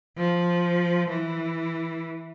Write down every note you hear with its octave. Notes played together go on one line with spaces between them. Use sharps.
F3
E3